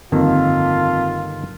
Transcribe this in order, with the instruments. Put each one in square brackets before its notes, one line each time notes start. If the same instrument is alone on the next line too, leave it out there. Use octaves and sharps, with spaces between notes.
[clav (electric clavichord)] G1 D#3 A#3 [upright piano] F2 [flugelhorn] F4